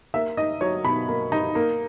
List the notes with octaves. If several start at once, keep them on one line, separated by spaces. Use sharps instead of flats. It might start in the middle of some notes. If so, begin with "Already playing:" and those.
A#3 E5
D#4 D#5
F#3 C#5
B2 B5
A#3
D#4
A#3